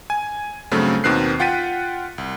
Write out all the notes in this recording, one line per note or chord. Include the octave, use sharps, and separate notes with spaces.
G#5
G2 C#3 F#3 A3 C4
D#2 B2 D#3 C4 F#6 C7
F4 F#5 G5 A6 B6 D#7
C2